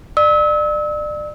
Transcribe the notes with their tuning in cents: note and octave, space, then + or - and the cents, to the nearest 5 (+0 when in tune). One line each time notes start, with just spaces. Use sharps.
D5 +30 E6 -35